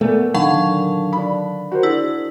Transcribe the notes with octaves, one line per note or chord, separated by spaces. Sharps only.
A#2 A3 B3
D3 D#3 F#3 F5 A5
D4 B5
F#4 A#4 C5
D4 E4 G#4